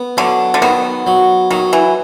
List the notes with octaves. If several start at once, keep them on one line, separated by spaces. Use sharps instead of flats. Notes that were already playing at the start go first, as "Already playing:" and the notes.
Already playing: B3
D3 F#3
D3
D#3 B3
F#3
D#3 F#3
E3